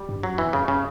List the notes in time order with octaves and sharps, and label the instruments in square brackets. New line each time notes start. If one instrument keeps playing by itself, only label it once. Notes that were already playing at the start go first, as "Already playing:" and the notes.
Already playing: [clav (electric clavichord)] G3
[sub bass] G2
[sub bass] F#2 [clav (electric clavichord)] F#3
[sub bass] E2 [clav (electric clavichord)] E3
[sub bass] F#2 [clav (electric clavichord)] C#3
[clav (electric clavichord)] C#3